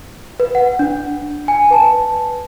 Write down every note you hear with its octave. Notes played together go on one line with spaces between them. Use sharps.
B4
F#5
D4
G#5
B4 A5